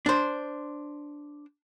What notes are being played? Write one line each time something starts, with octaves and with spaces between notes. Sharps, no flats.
D4 C5